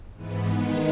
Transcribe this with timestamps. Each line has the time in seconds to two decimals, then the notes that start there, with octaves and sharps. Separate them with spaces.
0.13 G#2 E3 B3
0.47 D#3 G#3 B3 D#4